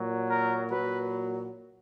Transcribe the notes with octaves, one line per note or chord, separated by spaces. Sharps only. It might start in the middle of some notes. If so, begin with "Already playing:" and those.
Already playing: A#2 F#3
A#4
A#2 F#3 B4